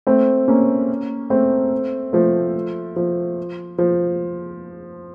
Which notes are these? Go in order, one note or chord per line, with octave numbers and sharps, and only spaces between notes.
A3 C4
A#3 C#4
A3 C4
F3 A3
F3
F3